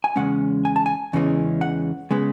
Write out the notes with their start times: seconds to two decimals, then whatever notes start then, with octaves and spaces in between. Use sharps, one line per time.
0.04 G#5
0.16 E2 C#3 G#3 C#4 F#5
0.65 G#5
0.76 A5
0.86 G#5
1.13 E2 C#3 E3 G#3 C#4
1.61 F#5
2.11 C#3 G#3 B3